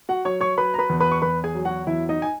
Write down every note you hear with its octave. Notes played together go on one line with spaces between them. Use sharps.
F#4 F#5
F#3 C#5 C#6
C#5 C#6
F#3 B4 B5
A#5
B4 B5
E2
B4 B5
C#6
E2 B4 B5
G#4 G#5
F#3
F#4 F#5
E2 E4 E5
D#4 D#5
G#5